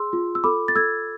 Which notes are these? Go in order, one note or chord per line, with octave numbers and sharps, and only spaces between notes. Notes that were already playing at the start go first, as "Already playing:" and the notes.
Already playing: G#4 C6 E6
F4
E6
A4 B5 D6
A6
A4 E6 G#6